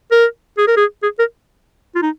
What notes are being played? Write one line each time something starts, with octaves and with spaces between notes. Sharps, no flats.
A#4
G#4
A#4
G#4
G#4
A#4
F4
D#4